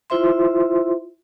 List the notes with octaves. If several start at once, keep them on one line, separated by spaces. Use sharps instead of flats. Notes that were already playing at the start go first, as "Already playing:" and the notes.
E4 F4 C5 E5 C6